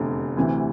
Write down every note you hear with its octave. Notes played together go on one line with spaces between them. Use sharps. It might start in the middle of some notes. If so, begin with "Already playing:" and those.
Already playing: F1 E2 D3 A3
D2 C3 E3